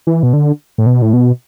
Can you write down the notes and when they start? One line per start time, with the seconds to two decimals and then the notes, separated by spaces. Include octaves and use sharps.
0.07 E3
0.23 B2
0.33 D3
0.78 A2
0.86 B2
1.02 A2
1.13 B2